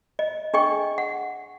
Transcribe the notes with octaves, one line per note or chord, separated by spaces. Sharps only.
D#5
D4 G#4 D#5 G5 C#6
F#5